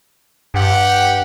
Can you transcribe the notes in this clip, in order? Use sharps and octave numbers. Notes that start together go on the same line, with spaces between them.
G2 G4 F#5